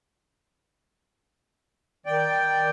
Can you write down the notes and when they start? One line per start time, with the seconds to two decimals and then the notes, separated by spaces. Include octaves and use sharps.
2.06 D#3 D5 G5